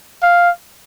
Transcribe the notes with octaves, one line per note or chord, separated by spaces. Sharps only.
F5